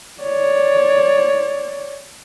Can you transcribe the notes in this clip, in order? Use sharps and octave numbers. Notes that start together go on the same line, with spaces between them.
C#5 D5